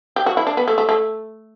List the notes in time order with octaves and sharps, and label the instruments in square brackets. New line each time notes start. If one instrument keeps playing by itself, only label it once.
[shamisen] G4
F#4
E4
D4
B3
A3
A3
A3